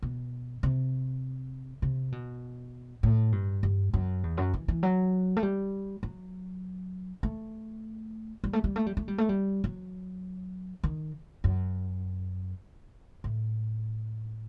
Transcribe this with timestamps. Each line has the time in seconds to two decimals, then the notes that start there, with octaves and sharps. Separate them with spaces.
0.02 B2
0.63 C3
1.82 C3
2.12 B2
3.03 A2
3.32 G2
3.63 G2
3.94 F#2
4.23 E2
4.37 F#2
4.54 E3
4.68 E3
4.83 F#3
5.37 A3
5.43 G3
6.03 F#3
7.23 A3
8.44 G3
8.53 A3
8.64 G3
8.76 A3
8.86 G3
8.97 A3
9.08 G3
9.18 A3
9.29 G3
9.64 F#3
10.84 D#3
11.44 F#2
13.24 A2